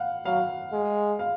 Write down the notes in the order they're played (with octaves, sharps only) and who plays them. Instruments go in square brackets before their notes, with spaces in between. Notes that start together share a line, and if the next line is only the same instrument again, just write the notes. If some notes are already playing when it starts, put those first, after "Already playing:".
Already playing: [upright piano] F5 F#5
[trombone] F#3 [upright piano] F5
[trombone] G#3
[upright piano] F5